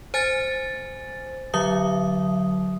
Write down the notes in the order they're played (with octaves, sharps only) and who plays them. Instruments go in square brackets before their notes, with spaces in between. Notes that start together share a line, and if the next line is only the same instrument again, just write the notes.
[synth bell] C5 G#5 A6
D3 F#3 E5 D#6